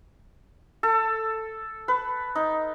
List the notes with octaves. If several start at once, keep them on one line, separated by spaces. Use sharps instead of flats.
A4
B4
D#4